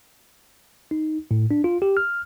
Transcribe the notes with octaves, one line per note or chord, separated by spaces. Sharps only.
D#4
A2
D4
F4
G4
F6